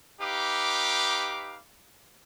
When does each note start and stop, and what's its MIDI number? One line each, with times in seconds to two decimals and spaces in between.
0.21 1.59 63
0.21 1.59 67
0.21 1.59 71
0.21 1.59 77
0.21 1.59 86